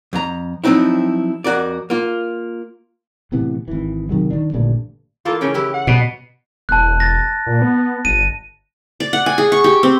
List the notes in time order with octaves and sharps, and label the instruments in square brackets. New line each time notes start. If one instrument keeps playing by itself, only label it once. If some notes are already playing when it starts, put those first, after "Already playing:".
[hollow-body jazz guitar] F2 A#5
F3 F#3 C4 D#4 E4
F2 F#4 A#4 D5
A#3 F4
[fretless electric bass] A2 C3 E3 B3
G#1 E3
C3 D#3 F#3 G#3
D#3 D4
A1 G2 A#2 D3
[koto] E3 A#3 A4 [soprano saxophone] F4
[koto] C#3 E3 G5 [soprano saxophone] C#4
[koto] C#4 E4 B4 [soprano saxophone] G4
[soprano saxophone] F#5
[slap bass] B2 [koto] G3
[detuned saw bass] E1 [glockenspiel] A5 F#6
[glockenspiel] A6 A#6
[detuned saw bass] A#2
B3
[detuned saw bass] G1 [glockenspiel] D#7
[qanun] D5
F#5
G#5
G#4
C#6
G4
C4